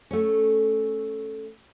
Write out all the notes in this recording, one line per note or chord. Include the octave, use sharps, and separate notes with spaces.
A3 C#4